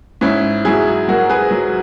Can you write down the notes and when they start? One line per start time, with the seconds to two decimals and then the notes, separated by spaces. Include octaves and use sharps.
0.21 G#2 C#4 E4
0.65 F#3 E4 G#4
1.08 F#3 F#4 A#4
1.29 G#4 B4
1.51 F#3